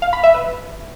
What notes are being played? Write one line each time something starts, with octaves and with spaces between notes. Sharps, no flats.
F5
B5
E5
B4